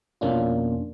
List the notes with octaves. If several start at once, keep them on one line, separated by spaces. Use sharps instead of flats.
F2 B2 A#3 C#4 D4 F4